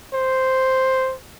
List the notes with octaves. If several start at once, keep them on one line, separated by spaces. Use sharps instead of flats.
C5